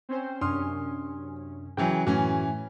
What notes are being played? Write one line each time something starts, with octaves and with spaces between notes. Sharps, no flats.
C4 C#4 C5
F#2 C3 C#4 D4 C6 D#6 F6
C#3 E3 F#3 G5
F#2 A2 E3 A3 C#4 F#4